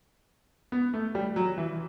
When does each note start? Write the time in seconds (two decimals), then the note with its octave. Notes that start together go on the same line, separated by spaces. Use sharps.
0.72 B3
0.94 A3
1.15 G3
1.36 F#3
1.58 E3